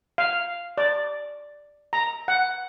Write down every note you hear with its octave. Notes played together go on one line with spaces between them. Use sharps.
F5
D5
A#5
F#5